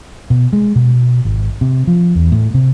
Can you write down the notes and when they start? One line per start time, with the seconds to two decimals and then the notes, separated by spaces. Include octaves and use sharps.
0.30 B2
0.53 G#3
0.76 B2
1.25 G#1
1.61 C3
1.87 F3
2.15 E2
2.32 A2
2.54 C3